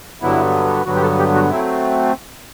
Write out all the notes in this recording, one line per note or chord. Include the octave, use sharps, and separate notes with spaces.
G2 D3 F#3 B3 E4
G2 D3 F#3 B3 F#4
G4
A4
G4
F#4
F#3 A3 C4 E4